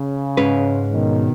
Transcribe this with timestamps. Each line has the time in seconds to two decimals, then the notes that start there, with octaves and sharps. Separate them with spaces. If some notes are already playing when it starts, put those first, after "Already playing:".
Already playing: C#3
0.37 G#2 G#3 C#4 B4
0.93 B2 D#3